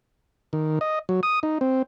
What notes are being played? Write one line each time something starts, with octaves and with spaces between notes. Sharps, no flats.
D#3
D#5
F#3
D#6
D#4
C4